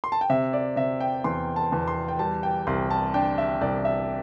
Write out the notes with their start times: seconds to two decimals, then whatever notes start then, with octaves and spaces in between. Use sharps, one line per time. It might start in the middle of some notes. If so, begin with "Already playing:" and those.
0.04 C6
0.12 A5
0.21 G5
0.30 C3 E5
0.53 D5
0.76 C3 E5
1.00 G5
1.24 E2 C6
1.56 A5
1.72 E2
1.88 C6
2.08 G5
2.19 G3 A5
2.43 G5
2.67 C2 C6
2.91 A5
3.14 D4 G5
3.38 E5
3.61 C2 D5
3.85 E5